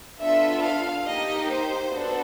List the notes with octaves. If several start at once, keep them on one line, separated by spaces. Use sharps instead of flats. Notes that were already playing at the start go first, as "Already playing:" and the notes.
B3 D4 F4 A4 E5
F5
A#3 D#4 G4 D#5
C5
B3 D4 F#4 A4